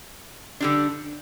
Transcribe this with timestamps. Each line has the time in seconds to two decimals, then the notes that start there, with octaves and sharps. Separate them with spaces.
0.60 D3 G3 D4